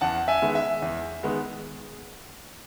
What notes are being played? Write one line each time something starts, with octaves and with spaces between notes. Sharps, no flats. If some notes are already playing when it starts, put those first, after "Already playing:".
E2 F#5 A5
E5 G#5
D#3 G#3 B3
E5
E2
D#3 G#3 B3